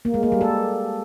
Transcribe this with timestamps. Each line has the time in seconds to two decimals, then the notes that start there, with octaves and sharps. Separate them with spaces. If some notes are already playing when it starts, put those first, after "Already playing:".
0.05 A#3
0.14 G#3
0.23 A#3
0.32 G3
0.41 A4